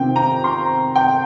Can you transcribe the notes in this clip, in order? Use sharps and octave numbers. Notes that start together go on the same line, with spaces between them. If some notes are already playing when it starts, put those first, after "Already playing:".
Already playing: C3 D#3 C4 F4 G5
A#5
C6
G5